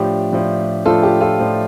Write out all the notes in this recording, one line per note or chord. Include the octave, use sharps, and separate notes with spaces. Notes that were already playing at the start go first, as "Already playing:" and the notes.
Already playing: A2 F3 D4 G4
A2 F3 D4
A2 F3 D4 F4 A4
G4
F4 A4
A2 F3 D4